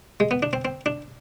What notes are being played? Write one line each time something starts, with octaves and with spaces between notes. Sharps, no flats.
G#3
B3
D4
C4
C4
D4